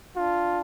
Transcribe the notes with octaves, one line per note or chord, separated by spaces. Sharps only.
D4 F4